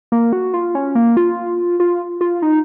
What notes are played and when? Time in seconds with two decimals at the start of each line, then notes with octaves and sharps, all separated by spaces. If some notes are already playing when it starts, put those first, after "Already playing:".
0.12 A#3
0.33 F#4
0.54 F4
0.75 C#4
0.95 A#3
1.17 F4
1.80 F4
2.21 F4
2.42 D#4